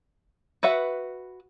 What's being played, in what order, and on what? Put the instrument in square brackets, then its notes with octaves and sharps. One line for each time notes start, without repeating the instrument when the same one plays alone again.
[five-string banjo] F#4 B4 E5 F#5